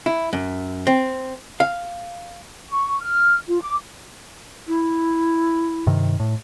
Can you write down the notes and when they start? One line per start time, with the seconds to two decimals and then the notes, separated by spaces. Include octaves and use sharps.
0.06 E4
0.33 F#2
0.87 C4
1.60 F5
2.69 C#6
3.01 F6
3.48 F4
3.61 D6
4.68 E4
5.87 G2 C3 D#3
6.20 A2